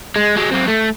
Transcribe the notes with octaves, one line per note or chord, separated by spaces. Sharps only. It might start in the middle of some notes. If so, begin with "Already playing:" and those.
G#3
F#3 G#3
F#3 C4
A3